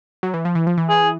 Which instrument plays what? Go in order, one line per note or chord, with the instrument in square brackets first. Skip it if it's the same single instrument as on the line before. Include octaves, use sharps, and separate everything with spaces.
[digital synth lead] F#3
E3
F3
E3
F3
E3
[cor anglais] G#4